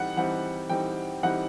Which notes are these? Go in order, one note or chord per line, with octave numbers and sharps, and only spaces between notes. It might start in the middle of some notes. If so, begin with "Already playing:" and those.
Already playing: E3 G3 C4 D#4 F#5
E3 G3 C4 D#4 F#5
E3 G3 C4 D#4 G5
E3 G3 C4 D#4 F#5